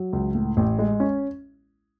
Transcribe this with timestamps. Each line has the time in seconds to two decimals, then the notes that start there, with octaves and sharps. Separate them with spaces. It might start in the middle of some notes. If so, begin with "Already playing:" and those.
Already playing: F#3
0.13 C#2
0.35 A2
0.57 A1
0.79 G#3
1.00 C#4